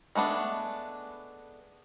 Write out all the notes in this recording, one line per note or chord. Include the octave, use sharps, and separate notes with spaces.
G#3 A3 B3 D4